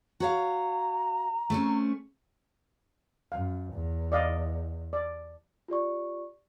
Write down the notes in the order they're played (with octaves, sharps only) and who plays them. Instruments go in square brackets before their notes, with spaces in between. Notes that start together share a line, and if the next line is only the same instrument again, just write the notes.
[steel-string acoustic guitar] F#4 C#5 F5 [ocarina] A#5
[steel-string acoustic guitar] A3 C4 C#4
[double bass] F#2 [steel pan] F5
[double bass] E2
[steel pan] D5 D#5 F5
D5
[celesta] F4 G4 D5 C#6